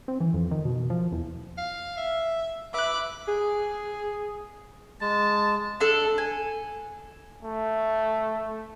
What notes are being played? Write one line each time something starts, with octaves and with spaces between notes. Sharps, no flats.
C4
E3
F2
D#3
B2
F3
E2
F5
E5
B4 E5 D6 F#6
G#4
G#3 A5
D4 A4
G#5
A3